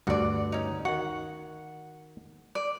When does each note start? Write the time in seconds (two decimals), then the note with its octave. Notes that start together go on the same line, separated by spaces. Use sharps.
0.07 D2 G2 F#4 D5
0.52 C#4 D#4
0.85 D#3 F#4 F#5
2.55 D5